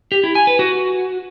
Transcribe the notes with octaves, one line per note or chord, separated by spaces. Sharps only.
G4
E4
G#5
B4
F#4